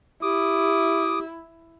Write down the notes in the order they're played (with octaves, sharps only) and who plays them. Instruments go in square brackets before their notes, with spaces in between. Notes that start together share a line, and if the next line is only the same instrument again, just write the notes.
[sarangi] E4 [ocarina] G4 [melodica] D6 D#6